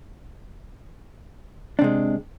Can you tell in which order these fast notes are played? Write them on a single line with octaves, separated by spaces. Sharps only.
D4 C3 G#3